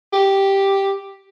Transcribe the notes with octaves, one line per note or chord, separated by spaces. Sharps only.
G4